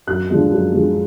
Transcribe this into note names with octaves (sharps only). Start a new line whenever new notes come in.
F#2 F#6
D3 F3 G#3
F#2
D3 F3 G#3